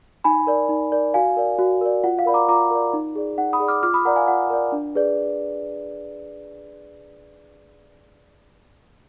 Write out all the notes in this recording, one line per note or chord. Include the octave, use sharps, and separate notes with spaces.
D#4 G#5 B5
A#4 D5
D#4
A#4 D5
F#4 F5 G#5
A#4 D5
F#4
A#4 D5
F4 F#5
F5
A#4 D5 B5
A#5 D6
F4 A#5 D6
A#4 D5
D#4
G#4 D5
D#4 F#5
B5 D#6
G#4 D5
D6 F6
F4 D6 F6
B5 D#6
A#4 D5 F#5 A#5
F5 G#5
F4 F#5
A#4 D5
D4
G#4 B4 D5